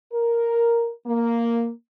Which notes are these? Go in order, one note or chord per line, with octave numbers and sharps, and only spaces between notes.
A#4
A#3